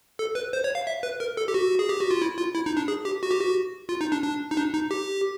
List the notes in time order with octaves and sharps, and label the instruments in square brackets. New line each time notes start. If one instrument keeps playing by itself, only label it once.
[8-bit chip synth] A4
B4
C5
C#5
F5
E5
B4
A#4
A4
G4
F#4
G#4
G4
F#4
F4
E4
F4
E4
D#4
D4
G#4
G4
F#4
G4
F#4
F4
D#4
D4
D4
D#4
D4
D#4
G4